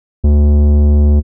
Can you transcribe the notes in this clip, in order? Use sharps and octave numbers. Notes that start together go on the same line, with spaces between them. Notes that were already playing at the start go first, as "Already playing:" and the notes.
D2